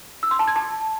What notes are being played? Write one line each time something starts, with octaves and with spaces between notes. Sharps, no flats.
E6
C6
A5
G#6
A5